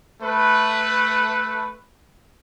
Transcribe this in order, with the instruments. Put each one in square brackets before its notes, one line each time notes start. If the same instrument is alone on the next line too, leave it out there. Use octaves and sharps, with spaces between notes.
[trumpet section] A3 B4